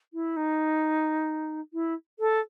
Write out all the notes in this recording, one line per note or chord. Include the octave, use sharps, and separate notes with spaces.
E4
D#4
E4
A4